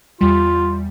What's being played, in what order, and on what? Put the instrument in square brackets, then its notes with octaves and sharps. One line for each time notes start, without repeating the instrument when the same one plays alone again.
[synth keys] E2 G3 [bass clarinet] F4